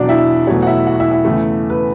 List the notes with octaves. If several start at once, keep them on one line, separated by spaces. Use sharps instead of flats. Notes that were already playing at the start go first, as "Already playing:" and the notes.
Already playing: E1 E2 B2 F#3 D4 D5
E4 E5
E2 B2 F#3 A3 C#5
F#5
E4 E5
F#4 F#5
E4 E5
E4 E5
E2 C#3 E3 A3
B4